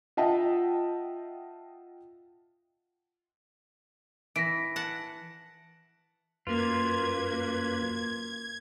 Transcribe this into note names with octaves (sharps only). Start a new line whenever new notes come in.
F4 D#5 E5 F#5 G5 A5
E3 A#6 B6 D7
F#5 A5
F#2 A#3 F4 B4 G#6